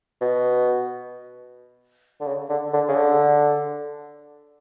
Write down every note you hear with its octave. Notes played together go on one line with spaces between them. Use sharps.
B2
D3
C#3
D3
D3
C#3
D3